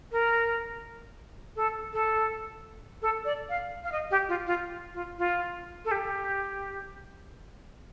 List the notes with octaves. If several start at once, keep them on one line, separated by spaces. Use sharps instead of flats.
A#4
A4
A4
A4
D5
F5
F5
D#5
G4
F4
F4
F4
F4
A4
G4